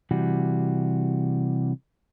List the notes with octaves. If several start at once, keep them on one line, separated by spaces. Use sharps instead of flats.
C3 E3 G3 F#4